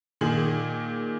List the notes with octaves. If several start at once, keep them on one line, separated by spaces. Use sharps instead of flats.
A#2 D#3 G#4 F#7